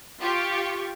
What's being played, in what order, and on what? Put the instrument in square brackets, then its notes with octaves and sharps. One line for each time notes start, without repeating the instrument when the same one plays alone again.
[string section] F4 G4 C#6